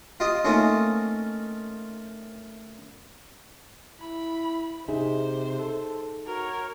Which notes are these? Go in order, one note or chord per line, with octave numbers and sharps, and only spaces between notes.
F4 G4 D#5
A3 A#3 C4 C#4 D#4 F4
E4 B5
C3 D#4 G#4 C5 E5
A4
F#4 A#4 C#5